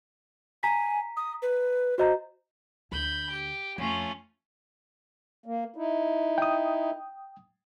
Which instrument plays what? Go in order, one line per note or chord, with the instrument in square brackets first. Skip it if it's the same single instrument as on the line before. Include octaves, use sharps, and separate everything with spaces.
[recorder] G#5 [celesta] A#5 B6
[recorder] D#6
B4
[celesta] F#4 D#5 A#5 [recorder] C5
[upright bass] D2 [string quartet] B5 G6
[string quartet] G4
[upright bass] F2 [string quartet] A3 C#4 F4
[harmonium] A#3
D#4 E4
[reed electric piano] G5 D#6